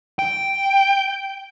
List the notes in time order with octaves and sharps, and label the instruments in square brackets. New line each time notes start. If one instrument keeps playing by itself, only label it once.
[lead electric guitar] G5